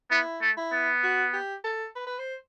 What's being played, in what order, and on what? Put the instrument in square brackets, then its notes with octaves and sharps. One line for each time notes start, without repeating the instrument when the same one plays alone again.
[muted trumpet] B3 [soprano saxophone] E4
[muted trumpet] A3
[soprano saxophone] E4
[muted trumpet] B3
[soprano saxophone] F#4
G4
A4
B4
B4
C5